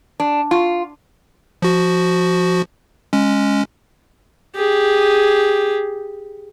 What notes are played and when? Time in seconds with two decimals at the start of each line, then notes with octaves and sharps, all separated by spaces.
0.20 D4
0.51 F4
1.62 F3 F#4
3.13 G#3 C#4
4.56 G4 G#4